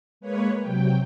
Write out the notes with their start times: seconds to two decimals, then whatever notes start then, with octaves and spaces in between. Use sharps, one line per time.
0.21 G#3 A#3 B4 C#5
0.61 C3 F#3 G5